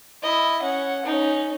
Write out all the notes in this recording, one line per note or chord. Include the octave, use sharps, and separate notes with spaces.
E4 D#5
C#4 F#5
C#4 D#4